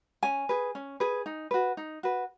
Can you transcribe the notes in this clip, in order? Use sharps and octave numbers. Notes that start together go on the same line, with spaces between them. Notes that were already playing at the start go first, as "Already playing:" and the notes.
C#4 G#5
G#4 B4
C#4
G#4 B4
D#4
F#4 B4
D#4
F#4 B4